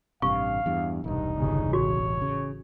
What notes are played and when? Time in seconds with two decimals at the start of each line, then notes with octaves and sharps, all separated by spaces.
0.22 A1 G2 C3 F5 C#6
0.66 E2 G2
1.04 E1 C2 G2 D#4
1.38 G1 C#3
1.73 A1 F#4 C#5
2.22 C#3